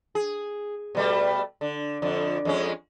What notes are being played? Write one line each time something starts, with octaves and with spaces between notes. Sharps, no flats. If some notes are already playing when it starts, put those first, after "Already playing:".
G#4
B2 G3 A3
D3
F2 D3
F2 G#3 C#4